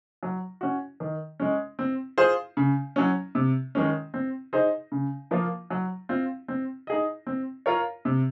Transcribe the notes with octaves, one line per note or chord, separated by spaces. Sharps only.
F#3
C#4 F#4
D#3
G#3 C#4
C4
F4 G#4 C5
C#3
F#3 C#4
C3
D#3 G#3 C#4
C4
D#4 G#4 C5 D#5
C#3
F3 A#3 F4
F#3
C4 F4
C4
D#4 G#4 D#5
C4
F4 A#4 C#5
C3